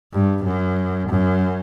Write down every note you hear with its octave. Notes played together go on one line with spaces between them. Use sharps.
G2
F#2
F#2